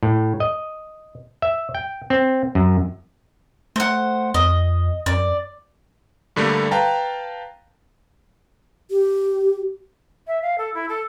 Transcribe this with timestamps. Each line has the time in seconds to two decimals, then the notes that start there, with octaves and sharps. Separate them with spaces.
0.03 A2
0.40 D#5
1.42 E5
1.75 G5
2.10 C4
2.55 F#2
3.76 A3 C5 F#5
4.34 F2 D#5
5.06 F#2 D5
6.36 G2 D3 G3 A3 A#3
6.71 B4 F5 G5 A5 A#5
8.91 G4
10.27 E5
10.42 F5
10.58 A4
10.74 E4
10.89 A4